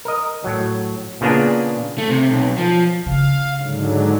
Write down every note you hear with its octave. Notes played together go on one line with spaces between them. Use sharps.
A#4 D#5
A2 F#3
A#2 C#3 A#3 B3 D4 G#4
A3
C3
B1
F3
C#3 F5
G#2 D3 F#3